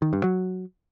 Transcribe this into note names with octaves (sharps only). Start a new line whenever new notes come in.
D#3
G2
F#3